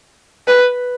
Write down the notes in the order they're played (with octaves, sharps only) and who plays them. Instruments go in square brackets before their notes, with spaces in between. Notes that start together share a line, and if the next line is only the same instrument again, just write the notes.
[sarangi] B4